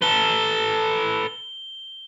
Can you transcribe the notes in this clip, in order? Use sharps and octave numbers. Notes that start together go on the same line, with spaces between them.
A4 B4 G7